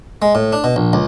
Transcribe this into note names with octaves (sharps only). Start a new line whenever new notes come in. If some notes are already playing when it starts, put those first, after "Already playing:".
G#3
A2
D4
B2
A#1
C#2